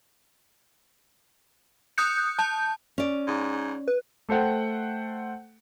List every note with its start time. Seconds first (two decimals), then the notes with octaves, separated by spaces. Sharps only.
1.98 D#6 F#6 G6 C#7
2.39 A5 G6
2.98 C#4 D5
3.27 G#2
3.88 B4
4.29 A3 A4 C5 F#5 G5